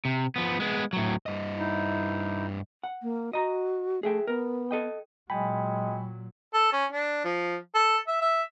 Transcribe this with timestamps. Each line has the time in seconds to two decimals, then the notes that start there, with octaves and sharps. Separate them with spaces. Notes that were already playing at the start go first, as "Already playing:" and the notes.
0.05 C3
0.36 F3 B3
0.60 G#3 B3
0.93 A2 F#3
1.26 G2 D#5
1.58 D#4 E4
2.83 F#5
3.03 A#3
3.33 F#4 D#5 A#5
4.03 A3 G#4 E5 G5
4.27 B3 A#4
4.71 A4 D#5 G5
5.30 A#2 F#3 G#3 G5 G#5 B5
6.54 A4
6.72 C#4
6.92 D4
7.24 F3
7.75 A4
8.07 E5
8.21 E5